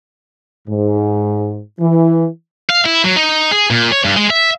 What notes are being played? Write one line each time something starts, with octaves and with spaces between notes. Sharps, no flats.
G#2
E3
F5
E4
F#3
D#4
G#4
A#2
C#5
G2
G#3
E5